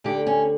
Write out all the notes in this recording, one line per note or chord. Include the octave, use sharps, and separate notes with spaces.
D2 D3 G4
C#4